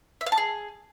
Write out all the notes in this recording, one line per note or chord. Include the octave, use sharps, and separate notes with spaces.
E5
F5
A5
G#4